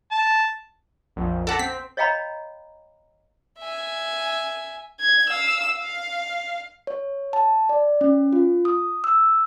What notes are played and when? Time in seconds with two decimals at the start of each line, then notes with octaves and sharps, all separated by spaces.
0.11 A5
1.16 A#1 F2
1.47 A4 F#5 A5 D6 A#6 B6
1.59 C4 B6
1.97 C#5 D#5 F5 G5 A#5 B5
3.59 E5 G#5
5.00 G#6
5.30 F5 E6
5.76 F5
6.87 C#5
7.33 A5
7.69 D5
8.01 C#4
8.33 F4
8.65 D#6
9.04 E6